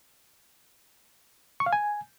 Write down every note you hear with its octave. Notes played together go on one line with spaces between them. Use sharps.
C#6
F5
G#5